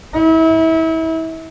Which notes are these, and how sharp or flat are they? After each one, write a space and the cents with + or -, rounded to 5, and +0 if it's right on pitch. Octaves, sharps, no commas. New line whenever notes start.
E4 -30